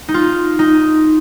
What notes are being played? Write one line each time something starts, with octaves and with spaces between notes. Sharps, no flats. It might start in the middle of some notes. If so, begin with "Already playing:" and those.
D#4
F4
D#4